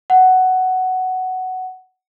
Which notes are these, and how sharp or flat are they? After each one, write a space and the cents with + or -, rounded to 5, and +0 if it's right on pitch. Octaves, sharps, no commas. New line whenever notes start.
F#5 +10